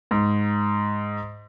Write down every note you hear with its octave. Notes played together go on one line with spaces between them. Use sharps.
G#2